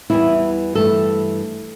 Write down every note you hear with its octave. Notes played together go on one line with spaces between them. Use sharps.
E2 E3 G3 B3 E4
G2 E3 A3 A4